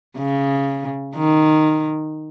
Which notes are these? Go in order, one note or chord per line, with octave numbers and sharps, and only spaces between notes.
C#3
D#3